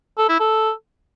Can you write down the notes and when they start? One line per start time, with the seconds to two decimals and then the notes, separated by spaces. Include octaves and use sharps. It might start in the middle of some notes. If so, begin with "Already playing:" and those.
0.18 A4
0.29 E4
0.40 A4